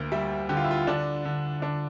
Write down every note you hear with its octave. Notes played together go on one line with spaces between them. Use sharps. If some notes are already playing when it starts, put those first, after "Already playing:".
Already playing: D2 A#3
G3 E5
D3 G4
F4
E4
F4
D3 D4
D3
D3 D4